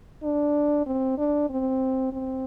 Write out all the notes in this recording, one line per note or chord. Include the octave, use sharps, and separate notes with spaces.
D4
C4
D4
C4
C4